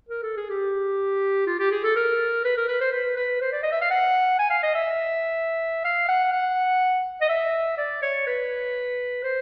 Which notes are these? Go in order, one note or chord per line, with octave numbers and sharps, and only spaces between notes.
A#4
A4
G#4
G4
F4
G4
G#4
A4
A#4
B4
A#4
B4
C5
B4
B4
C5
D5
D#5
E5
F5
F#5
G#5
F5
D#5
E5
F5
F#5
F#5
D#5
E5
D5
C#5
B4
C5